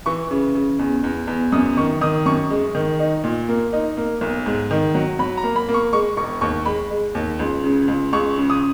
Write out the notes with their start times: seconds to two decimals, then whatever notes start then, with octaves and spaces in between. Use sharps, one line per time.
0.06 E3 C#6
0.31 C#3
0.55 C#3
0.79 E2
1.04 E2
1.28 E2
1.52 F#2 D#6
1.77 D#3 C#6
2.01 D#3 D#6
2.26 F#2 C#6
2.50 G#3
2.75 D#3
2.99 D#4
3.24 A#2
3.48 A#3
3.73 D#4
3.97 A#3
4.21 B1
4.46 G#2
4.71 D#3
4.95 F#3
5.19 F#3 B5
5.37 A#5
5.43 A#3
5.56 B5
5.69 A#3
5.74 C#6
5.93 G#3 C#6
6.17 E1 C#6
6.41 D#2 C#6
6.65 G#3 B5
6.91 G#3
7.15 D#2
7.39 C#2
7.64 C#3
7.88 C#2
8.13 C#2 C#6
8.37 C#3
8.50 D#6